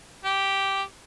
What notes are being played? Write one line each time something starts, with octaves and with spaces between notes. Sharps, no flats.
G4